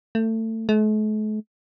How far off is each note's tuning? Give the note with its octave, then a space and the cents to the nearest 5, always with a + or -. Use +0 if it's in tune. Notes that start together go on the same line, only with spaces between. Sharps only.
A3 +25
A3 -45